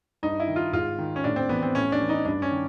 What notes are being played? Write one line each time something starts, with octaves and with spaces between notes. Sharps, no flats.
G2 D#4
E4
D#3
F4
G#2 F4
D#3
C#4
A2 D4
C4
E3 B3
C4
A2 C#4
D4
E3
D#4
G2 D4
C#4
D#3